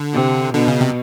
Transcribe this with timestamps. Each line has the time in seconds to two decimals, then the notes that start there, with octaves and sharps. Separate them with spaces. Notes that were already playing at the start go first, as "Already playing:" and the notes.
Already playing: D3
0.13 C3
0.53 B2 D3
0.68 C#3
0.81 C3